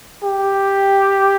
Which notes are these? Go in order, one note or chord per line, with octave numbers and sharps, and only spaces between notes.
G4